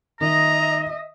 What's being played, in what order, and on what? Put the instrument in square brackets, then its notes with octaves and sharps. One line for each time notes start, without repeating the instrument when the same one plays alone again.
[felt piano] D#3 [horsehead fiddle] D#5 E5 [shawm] A#5